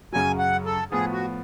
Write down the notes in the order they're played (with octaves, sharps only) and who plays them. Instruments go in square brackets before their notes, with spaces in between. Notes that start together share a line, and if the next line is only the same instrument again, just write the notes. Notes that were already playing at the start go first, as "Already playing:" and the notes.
[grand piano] F#2 C#3 F#3 [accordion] G#5
[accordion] F#5
A4
[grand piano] A2 F3 B3 [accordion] G#4
[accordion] F#4